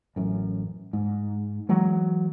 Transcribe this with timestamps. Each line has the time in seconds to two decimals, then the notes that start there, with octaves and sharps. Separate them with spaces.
0.16 A1 F#2
0.93 G#2
1.69 E3 F#3 G#3